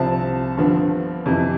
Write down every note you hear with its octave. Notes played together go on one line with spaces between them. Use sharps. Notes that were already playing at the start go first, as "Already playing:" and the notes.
Already playing: C2 C3 F3 C4 A5
G2 D3 F3 B3
F2 C3 E3